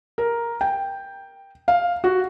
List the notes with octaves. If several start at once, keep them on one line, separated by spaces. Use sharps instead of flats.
A#4
G5
F5
F#4